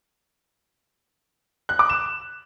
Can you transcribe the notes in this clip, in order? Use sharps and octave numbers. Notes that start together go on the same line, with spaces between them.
F#6
D6
E7